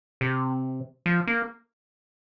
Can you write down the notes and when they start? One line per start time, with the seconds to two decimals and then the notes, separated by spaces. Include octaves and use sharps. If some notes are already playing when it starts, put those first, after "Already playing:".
0.21 C3
1.06 F3
1.27 A#3